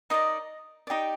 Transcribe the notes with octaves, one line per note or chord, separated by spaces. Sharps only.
D#4 A#4 D5 D#5
D#4 G4 D5